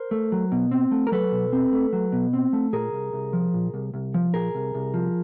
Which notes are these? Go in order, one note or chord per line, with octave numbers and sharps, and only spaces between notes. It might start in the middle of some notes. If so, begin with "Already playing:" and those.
Already playing: A#4 C5
A3
F#3
B2
C4
A3
A#4
F#3 A4 B4
B2
C4
A3
F#3
B2
C4
A3
A#2 G#4 A#4
C2
C2
F3
A#2
C2
C2
F3
A#2 G#4 A#4
C2
C2
F3